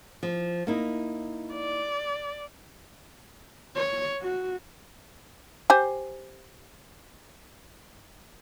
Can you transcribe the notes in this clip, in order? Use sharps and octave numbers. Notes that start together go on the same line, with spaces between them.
F3
A#3 D#4 E4
D5
C#5
F#4
G4 C5 G#5